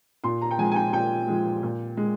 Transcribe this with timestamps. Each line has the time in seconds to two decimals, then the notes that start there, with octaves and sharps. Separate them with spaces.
0.24 A#2 C6
0.41 A#5
0.51 G5
0.58 F3 G#3 G#5
0.72 G#5
0.76 G5
0.93 A#2 G5
1.28 F3 G#3
1.63 A#2
1.97 G#3